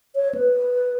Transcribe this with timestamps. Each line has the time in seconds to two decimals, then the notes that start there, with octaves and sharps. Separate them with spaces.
0.16 C#5
0.35 B4